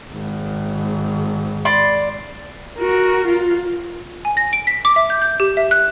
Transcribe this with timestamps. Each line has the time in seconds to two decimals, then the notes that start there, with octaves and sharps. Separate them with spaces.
0.13 G#1
1.65 D5 B5 C6
2.79 F#4 A#4
3.28 F4
4.25 G#5
4.37 A#6
4.53 D7
4.67 B6
4.85 D6
4.96 E5
5.10 G6
5.22 G6
5.40 G4
5.57 E5
5.71 F#6